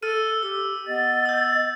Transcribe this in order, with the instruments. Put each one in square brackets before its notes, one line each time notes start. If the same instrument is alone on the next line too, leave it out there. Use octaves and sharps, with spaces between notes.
[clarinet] A4 [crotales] E6 F6 D#7
[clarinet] G4 [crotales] E6
[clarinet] B3 [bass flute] D#5 [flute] A6
[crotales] E6 G6